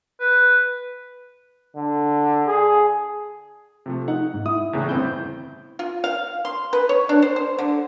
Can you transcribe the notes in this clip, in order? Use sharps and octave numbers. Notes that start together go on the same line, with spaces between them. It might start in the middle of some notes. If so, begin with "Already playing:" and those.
B4
D3
G#4
C3 F3 A3
D#4 F#5
G#2
E4 D#6
E2 A2 C#3
G1 C4 E4 G6
F4
F5
C6
B4
C#5
D4
C5
C5
D3